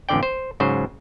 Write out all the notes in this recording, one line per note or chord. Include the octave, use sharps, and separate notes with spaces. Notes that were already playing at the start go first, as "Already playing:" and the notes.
A1 F2 D3 D5 G5
C5
G#2 C#3 F#3 C5